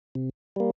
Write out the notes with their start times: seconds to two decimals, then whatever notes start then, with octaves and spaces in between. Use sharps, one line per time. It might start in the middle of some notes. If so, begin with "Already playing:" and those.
0.15 C3
0.56 G3 A#3